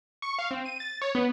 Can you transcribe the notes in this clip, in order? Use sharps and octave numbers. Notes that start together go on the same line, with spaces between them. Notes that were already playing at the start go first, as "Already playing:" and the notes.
C#6
F5
C4
D#7
A6
C#5
B3